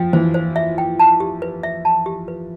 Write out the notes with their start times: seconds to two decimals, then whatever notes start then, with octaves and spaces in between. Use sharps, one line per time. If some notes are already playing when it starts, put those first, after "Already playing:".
Already playing: F3 G5
0.13 E3 C5
0.34 C5
0.56 E5
0.78 G5
0.99 A5
1.20 G4
1.42 B4
1.63 E5
1.85 A5
2.06 G4
2.28 B4